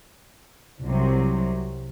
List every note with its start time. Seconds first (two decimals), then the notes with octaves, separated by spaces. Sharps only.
0.82 C2 C3 F#3